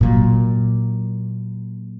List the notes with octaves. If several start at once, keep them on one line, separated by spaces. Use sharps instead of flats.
A#2 F#3